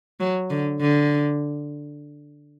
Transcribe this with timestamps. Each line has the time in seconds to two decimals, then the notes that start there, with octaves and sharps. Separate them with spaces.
0.20 F#3
0.50 D3
0.81 D3